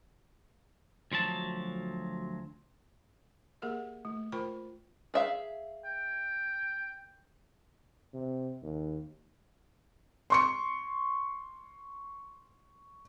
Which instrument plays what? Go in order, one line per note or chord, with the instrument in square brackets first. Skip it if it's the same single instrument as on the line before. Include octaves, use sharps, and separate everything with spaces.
[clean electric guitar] D2 F3 F#3 A5
[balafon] A#3 G4 G#4 A#4 E5
A3
F4 A#4 C5 G5 B5 C#6
[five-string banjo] G#4 E5 F5
[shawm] G5
[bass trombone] C3
D#2
[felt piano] C6 C#6 C#7